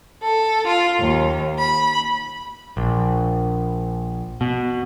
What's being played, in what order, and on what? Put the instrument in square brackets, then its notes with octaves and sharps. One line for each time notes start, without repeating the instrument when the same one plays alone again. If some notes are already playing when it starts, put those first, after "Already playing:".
[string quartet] A4
F4
D#2
B5
[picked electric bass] A#1
B2